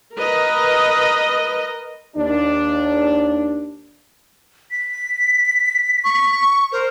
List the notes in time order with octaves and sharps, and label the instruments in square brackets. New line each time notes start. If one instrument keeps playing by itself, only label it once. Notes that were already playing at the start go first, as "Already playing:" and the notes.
[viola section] A#4 B4 D#5
[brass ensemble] D#2 D4
[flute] B6
[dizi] C#6
[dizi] A#4 [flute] C5